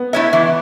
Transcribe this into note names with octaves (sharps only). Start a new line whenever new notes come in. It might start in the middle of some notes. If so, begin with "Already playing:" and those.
Already playing: B3
A3 E4 C#5 E5
E3